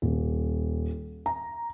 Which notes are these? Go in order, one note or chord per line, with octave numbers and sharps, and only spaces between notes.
D#1
A#5